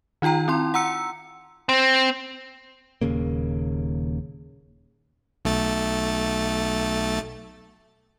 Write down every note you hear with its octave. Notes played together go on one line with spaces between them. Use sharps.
D#3 D#4 F4 G5 A#5
C4 E4 C6
F#5 A#5 E6 C#7
C4
D#1 D#2 C#3 A#3
B1 A3 A6